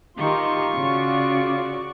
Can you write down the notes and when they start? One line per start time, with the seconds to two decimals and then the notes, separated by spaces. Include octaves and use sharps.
0.17 D#3 D#4 F4 G4 C6 C#6
0.76 C#3 F#4 D5